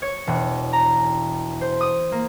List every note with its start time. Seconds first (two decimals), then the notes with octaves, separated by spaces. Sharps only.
0.02 C#5
0.27 E1
0.73 A#5
1.61 C5
1.81 D#6
2.12 A#3